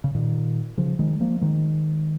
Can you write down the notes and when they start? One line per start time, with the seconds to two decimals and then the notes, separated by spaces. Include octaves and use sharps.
0.04 C#3
0.15 A#2 D#3
0.78 C#3 F3
0.99 D#3 G#3
1.20 F3 A#3
1.41 D#3 G#3